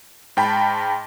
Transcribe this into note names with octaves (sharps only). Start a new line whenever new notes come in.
G#2 G5 A5 B5